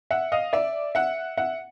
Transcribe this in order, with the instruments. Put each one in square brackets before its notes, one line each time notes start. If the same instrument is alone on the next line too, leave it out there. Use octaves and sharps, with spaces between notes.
[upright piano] E5 F#5
D#5 F5
D5 E5
E5 F#5
E5 F#5